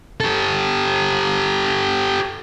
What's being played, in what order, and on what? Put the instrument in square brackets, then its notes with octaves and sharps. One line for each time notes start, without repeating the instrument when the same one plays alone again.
[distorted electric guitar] G4 A4